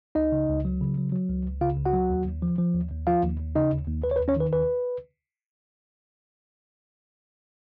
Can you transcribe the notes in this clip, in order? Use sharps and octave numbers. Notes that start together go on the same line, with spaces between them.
C#2 D#4 D#5
C#3
C#2
F#3
C#3
F#3
F#3
C#2
C#2
C#3 F4 F5
C#2
F#4 F#5
F#3
D#2
D#2
F3
F3
D#2
D#2
F3 F4 F5
D#2
D#2
C#3 D#4 D#5
D#2
D#2
D#2 B4
C#5
B4
D#2
C#4 C#5
D#3 B4
D#2 B4